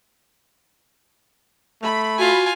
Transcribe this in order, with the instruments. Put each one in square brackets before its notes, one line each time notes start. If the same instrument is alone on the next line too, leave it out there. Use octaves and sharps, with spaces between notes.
[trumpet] A3 [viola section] B5
[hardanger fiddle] F4 G#5 [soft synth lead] F#4